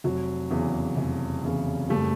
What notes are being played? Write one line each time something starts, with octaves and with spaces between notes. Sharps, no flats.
F1 F#3
E2 C#3 E3
F1
E2 C#3 E3
F#1 G3 A3